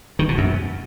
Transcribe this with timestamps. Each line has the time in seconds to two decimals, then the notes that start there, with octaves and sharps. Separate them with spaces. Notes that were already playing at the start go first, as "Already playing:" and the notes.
0.19 D#3
0.29 B2
0.38 F#2